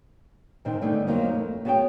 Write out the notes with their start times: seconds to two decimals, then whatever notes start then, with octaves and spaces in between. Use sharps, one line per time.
0.65 G#2 C3 D#3 G#3 C4 D#4
0.81 D3 G3 A3 B3 D4 D#4
1.07 F2 F#3 A#3 D#4
1.35 A3
1.65 B3 F#4 G#4 C#5 F#5 G5